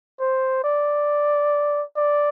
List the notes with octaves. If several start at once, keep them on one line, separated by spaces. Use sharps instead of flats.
C5
D5
D5